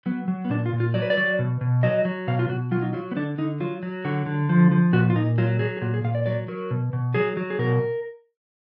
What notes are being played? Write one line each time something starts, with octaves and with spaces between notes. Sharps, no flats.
F#3 B3
F#3
B3
A#2 D4
F4
A#2
F4
F#3 D5
B4
D5
F#3
B2
B2
F#3 D#5
F#3
B2 F5
F4
B2 F#4
F#3 F4
D#4
F#3 F4
B3
D3 D4
D3 D#4
F#3 F4
F#3
D3 F#4
D3
F3
F3
A#2 F#4
F4
A#2 D#4
F#3 F4
F#3 G#4
G#4
A#2 F#4
G#4
A#2 F5
D5
F#3 D5
F#3 A#4
B2
B2
F#3 G#4
F#3
G#4
B2 A#4